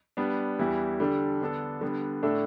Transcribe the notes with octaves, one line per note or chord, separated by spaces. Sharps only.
G3 B3 D4
E2 E3 G3 E4 G4
D3 G3 D4 A4
D3 B3 D4 A4
D3 G3 B3
A2 A3 D4 A4